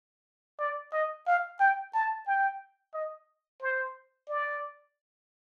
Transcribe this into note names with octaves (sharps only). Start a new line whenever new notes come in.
D5
D#5
F5
G5
A5
G5
D#5
C5
D5